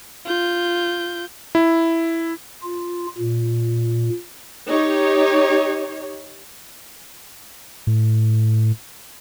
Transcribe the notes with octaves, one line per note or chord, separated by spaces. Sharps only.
F4 G6
E4
F4
A#2
D#4 G4 C#5
A2